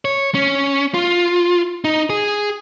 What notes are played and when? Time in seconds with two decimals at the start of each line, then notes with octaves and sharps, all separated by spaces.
0.05 C#5
0.34 C#4
0.94 F4
1.84 D#4
2.10 G#4